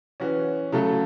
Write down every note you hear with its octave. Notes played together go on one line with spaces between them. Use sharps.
E3 C#4 F#4
C#3 F#3 A3 F#4 A4